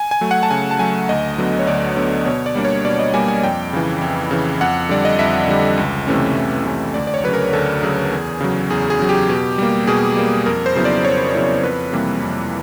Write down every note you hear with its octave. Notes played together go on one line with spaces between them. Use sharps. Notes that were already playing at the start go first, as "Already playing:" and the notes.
Already playing: G#5
G#5
F#3 A3
F#5
A5
C#3 G#5
A5
F#3 A3 G#5
D2 D#5
D3 F#3 B3
C#5
D2 D5
D3 F#3 B3
B2 C#5
D5
G3 A#3 D4
C#5
B2 D5
D#5
G3 A#3 D4 G#5
G#5
F2 G5
C#3 E3
F2
C#3 E3
F2 F#5
D3 G3 D5
D#5
F2 E5
D3 G3
C#2
C3 E3 A3 C#4
C#2
C3 E3 A3 C#4
D2 D5
D5
C#5
C#3 F#3 B4
A#4
D2 A4
C#3 F#3 G#4
E2
C#3 F#3
E2 G#4
G#4
C#3 F#3
G4
B2
G3 A#3
B2 G#4
G3 A#3
F2 A#4
C5
C#3 F#3 B3 E4
D5
F2 C#5
C#3 F#3 B3 E4
F2 B4
C3 E3 G3 A#3
F2